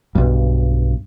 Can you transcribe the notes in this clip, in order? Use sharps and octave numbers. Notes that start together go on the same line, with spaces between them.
B1 G2